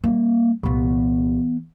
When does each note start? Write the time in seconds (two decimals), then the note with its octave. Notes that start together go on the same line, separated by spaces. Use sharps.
0.04 G3 A#3
0.63 C2 A#2 E3 B3